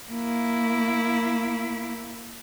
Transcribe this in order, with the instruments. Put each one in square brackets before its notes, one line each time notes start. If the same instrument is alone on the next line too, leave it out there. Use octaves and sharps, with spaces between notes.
[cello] A#3 E4